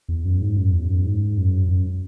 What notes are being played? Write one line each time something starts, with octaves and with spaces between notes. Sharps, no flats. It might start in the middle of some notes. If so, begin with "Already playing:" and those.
E2
F#2
G#2
F#2
E2
F#2
G#2
F#2
F#2